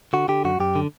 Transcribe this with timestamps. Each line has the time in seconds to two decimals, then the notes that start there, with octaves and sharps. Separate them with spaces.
0.13 D3 F#4
0.28 D3 G4
0.45 F#2 F#4
0.60 F#2 G4
0.75 D3